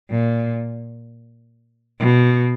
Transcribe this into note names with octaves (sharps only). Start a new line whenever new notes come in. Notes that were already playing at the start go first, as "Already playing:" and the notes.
A#2
B2